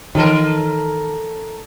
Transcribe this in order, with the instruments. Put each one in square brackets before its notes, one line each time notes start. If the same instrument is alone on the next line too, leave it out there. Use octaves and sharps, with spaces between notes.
[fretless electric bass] D#3 [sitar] E3 A4 A#4